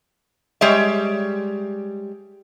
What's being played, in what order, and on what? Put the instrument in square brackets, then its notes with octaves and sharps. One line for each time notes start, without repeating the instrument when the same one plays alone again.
[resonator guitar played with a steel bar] G3 G#3 C#5 E5